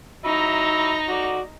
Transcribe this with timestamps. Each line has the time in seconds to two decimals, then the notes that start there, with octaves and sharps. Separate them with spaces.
0.25 F#3 D#4 E5 A#5 B5
1.09 F#4 D5